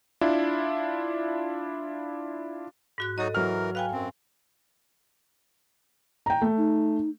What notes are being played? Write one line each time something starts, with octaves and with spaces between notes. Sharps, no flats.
D4 E4 F4
G#2 F#4 F#6
F#3 D#4 F#4 A4 D#5
E3 F#3 A#4 F6
B4 F5 G5 G#5
F#2 C4
G5 A#5
A3
D#4